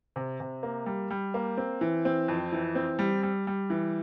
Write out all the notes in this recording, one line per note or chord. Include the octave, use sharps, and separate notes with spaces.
C3
C3
A#3
G3
G3
A#3
C4
E3
C4
F2
E3
C4
G3
G3
G3
E3